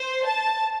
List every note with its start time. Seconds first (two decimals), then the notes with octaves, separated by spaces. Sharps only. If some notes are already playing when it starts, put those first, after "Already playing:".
Already playing: C5
0.25 A5